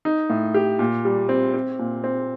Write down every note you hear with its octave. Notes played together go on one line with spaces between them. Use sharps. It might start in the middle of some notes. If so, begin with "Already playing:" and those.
D#4
A2
G4
A#2
G3
C4
C4
A#2
C4